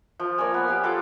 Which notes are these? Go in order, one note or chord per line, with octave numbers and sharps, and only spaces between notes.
F3
A#3 C#5 D5 G#5
B3
G4 F5 G#5
F4 A4 D5 D6